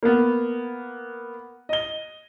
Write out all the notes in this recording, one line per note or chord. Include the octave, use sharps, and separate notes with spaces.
A#3 B3
D#5 G7